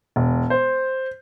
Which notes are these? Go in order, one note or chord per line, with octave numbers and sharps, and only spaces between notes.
E1
C5